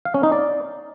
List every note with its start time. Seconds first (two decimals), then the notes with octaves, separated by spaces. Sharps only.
0.05 F5
0.14 C#4
0.23 D#4
0.32 D5